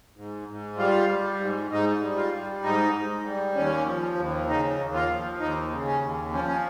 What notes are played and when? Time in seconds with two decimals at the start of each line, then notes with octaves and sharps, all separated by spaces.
0.16 G#2
0.48 G#2
0.78 G3 F4
1.10 G3
1.40 G#2
1.70 G#2 D#4
2.01 G3
2.17 F4
2.32 G3
2.63 G#2 D#4
2.94 G#2
3.25 G3
3.55 D#2 C#4
3.86 F3
4.17 D#2
4.47 C#3 D#4
4.78 D#2
4.94 F4
5.09 F3
5.39 D#2 D#4
5.71 C#3
5.86 C#4
6.01 D#2
6.33 F3 C#4
6.47 C#4